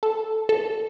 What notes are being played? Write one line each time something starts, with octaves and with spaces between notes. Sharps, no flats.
A4
A4